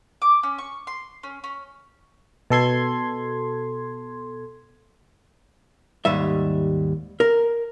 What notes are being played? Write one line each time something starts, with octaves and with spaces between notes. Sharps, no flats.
D6
C#4
C#6
C6
C#4
C#4
B2 A4 C6 G#6
D#2 G#2 G3 E5
A#4